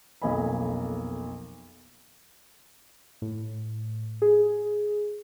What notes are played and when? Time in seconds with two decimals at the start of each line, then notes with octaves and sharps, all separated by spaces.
0.22 B1 F2 A#3 D#5 G#5 B5
3.22 A2
4.22 G#4